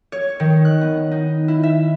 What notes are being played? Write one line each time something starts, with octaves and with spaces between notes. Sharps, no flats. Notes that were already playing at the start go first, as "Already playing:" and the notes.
C#5
D#3
F#6
B3
D#4
E4
E5